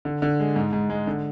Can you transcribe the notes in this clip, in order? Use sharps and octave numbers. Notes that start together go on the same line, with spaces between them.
D3
D3
G#3
G#2
G#2
G#3
D3